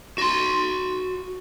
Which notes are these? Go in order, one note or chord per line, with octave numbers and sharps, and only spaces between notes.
F#4 C6